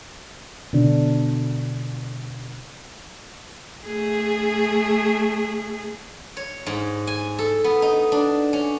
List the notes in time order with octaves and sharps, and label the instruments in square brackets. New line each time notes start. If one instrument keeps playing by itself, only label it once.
[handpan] B2 D3 D4
[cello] A3 G#4
[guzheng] C#5
G#2
G#5
A4
B3
D#4
D4
C#4